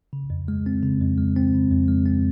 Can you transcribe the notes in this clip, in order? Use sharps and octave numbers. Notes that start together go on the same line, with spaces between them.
C#3
F2
G#3
C4
C#3
F2
G#3
C4
C#3
F2
G#3
C4